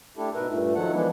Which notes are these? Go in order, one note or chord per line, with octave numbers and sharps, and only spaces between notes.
A3 D4 E4 G4 A4
G#2 B2 A#4 B4 E5
G2 A#2 A3
D#3 F3 F#3 A4 F#5
E3 F3 G#3 B3 D4 E4